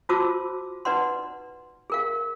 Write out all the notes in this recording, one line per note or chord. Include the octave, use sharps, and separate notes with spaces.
F4 F#4 C5 A5 D6 E6
D#4 B4 D5 F#5 C6
G#4 A#4 F5